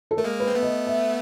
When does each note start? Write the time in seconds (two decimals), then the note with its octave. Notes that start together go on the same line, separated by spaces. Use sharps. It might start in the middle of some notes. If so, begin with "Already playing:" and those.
0.11 A4
0.17 A3 A#4
0.24 G#3 A#3
0.40 B4
0.47 C4
0.55 A3 B3
0.63 D#5
0.87 E5